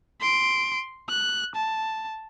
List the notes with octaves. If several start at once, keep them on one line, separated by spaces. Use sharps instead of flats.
C6 D7
F#6
A5